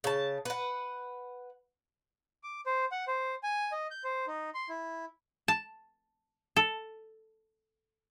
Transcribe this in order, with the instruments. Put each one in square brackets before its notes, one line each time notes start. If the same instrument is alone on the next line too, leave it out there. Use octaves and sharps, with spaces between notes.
[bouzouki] C#3 A5
B4 F#5
[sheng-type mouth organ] D6
C5
F#5
C5
G#5
D#5
G6
C5
D#4
C6
E4
[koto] A5
A4